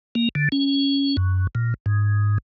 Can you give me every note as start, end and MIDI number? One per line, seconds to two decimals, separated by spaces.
0.15 0.29 58
0.35 0.49 50
0.52 1.16 61
1.17 1.47 42
1.55 1.74 46
1.86 2.38 44